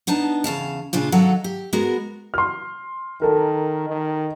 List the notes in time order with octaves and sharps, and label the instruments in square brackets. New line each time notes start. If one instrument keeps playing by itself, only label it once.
[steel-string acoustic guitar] B3 D4 D#4 A5
E2 C#3 F5 A5
A#2 C#3 D4 F4
D#3 F#3 A4 F5 F#5
G4
G#3 B3 F#4 A#4
[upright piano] C6 F6
[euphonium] D#3 [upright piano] A4 A#4
[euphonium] D#3